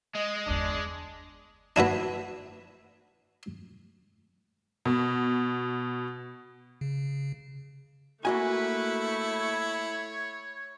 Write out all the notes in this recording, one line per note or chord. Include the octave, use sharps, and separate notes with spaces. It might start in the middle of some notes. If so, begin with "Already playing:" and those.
G#3 D#5
G1 E2 D4
D4 E4 F#4 B4
B2
C#3
A3 A#3 E4 F#4 B4 G#5 C#6
C#5